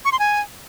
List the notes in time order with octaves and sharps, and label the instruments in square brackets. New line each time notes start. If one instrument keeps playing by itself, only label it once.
[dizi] C#6
C6
G#5